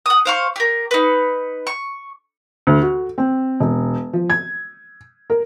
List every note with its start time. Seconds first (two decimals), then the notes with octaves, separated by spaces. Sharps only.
0.06 F#5 D#6
0.25 C5 F5 C#6
0.56 G4 A#4
0.91 D#4 B4
1.67 C#6
2.67 D2
2.82 F#4
3.18 C4
3.60 E1
4.13 F3
4.30 G#6
5.30 A#4